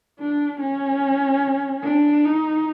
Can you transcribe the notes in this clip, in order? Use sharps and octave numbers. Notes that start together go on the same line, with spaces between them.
D4
C#4
D4
D#4